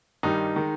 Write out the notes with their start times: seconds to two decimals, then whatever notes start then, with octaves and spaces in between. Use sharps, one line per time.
0.23 G2 D#3 G3 D#4
0.56 D#3 G#3